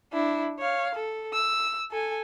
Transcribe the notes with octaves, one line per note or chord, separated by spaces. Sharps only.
D4 E4
C#5 F5
A4
E6
A4 G#5